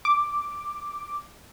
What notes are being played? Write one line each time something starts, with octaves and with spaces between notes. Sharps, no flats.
D6